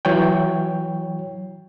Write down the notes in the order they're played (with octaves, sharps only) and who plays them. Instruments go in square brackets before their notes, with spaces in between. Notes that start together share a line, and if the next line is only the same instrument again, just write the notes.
[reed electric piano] E3 F#3 C#5 G5